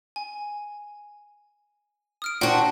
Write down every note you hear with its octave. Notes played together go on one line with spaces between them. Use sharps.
G#5
D#6 F6 D7
A#2 D4 F#4 C5 F#5 G5